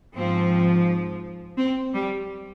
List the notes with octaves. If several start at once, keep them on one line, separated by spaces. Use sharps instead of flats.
G#2 F3 C4
C4
G3